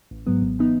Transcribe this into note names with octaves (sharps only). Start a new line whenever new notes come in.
A1
G#2 F#3 B3
G#1
E3 B3 D#4